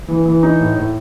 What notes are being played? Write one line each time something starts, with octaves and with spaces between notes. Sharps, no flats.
E3
E3
D#4
A2
A2